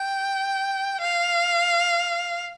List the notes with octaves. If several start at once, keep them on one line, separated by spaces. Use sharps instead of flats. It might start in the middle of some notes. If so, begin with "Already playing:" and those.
Already playing: G5
F5